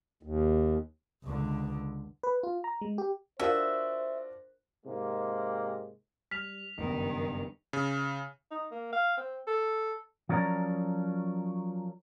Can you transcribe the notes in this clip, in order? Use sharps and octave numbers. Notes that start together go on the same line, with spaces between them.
D#2
C#2 D3
B4
F4
A#5
G#3
G4
D4 F4 F#4 A#4 C5 E5 F5
G#2 C3 G#3 A#3
G3 F6 B6 F7
F#1 G2 D#3 B3
C#3
D#4
A#3
F5
C4
A4
F3 F#3 C#4 A#4 D5 A#5